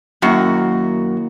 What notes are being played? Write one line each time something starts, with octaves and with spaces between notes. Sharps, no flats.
F#2 D#3 A#3 E4 F#4